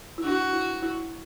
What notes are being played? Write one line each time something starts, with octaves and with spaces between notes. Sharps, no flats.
E4
D4 F#4
E4
E4